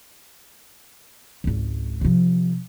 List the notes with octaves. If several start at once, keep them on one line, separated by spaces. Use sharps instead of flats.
G#1 C#2
C3 F3